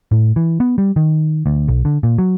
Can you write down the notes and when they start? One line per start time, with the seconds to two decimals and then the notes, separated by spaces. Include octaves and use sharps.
0.12 A2
0.36 E3
0.60 B3
0.78 G3
0.96 D#3
1.46 D2
1.68 B1
1.85 D3
2.03 A#2
2.18 F#3